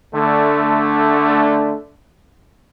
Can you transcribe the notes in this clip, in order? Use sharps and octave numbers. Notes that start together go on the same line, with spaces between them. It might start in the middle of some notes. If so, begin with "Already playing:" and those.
D3 A3